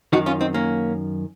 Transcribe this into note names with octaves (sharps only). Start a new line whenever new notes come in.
F#2 D#3 D#4 F#4
C#4 F4
C4 D#4
A#3 C#4